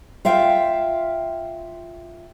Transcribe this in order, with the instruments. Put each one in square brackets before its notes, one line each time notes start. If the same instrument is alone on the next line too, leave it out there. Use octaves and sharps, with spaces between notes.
[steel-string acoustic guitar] F4 E5 F5 G5